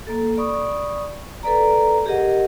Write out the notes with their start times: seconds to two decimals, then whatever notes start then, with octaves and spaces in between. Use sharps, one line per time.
0.07 A#3 A4
0.37 D5 B5 C#6 D#6
1.43 A4 B4 D5 A#5
2.06 G4 G#4 A#4 D#5 F#5